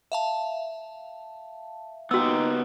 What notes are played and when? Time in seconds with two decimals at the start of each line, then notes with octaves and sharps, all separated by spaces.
0.12 E5 F5 A5
2.11 A#3 B3 D#4 F#4 G4 E6